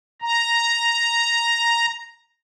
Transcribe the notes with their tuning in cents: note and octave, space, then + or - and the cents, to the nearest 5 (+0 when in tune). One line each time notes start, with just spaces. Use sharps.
A#5 +0